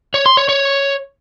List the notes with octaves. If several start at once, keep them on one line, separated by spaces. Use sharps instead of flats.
C#5
C6
C#5
C#5